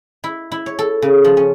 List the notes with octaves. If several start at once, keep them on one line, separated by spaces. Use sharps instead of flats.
E4
E4
C#5
A4
C#3
F3
C#4